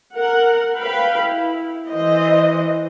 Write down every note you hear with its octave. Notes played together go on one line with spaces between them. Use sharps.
A#4 F#5
B4 F5 G5 B5
E4
E3 C5 D#5